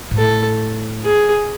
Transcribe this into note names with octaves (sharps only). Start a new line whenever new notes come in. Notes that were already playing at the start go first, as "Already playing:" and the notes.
G#2
A2 A4
G#4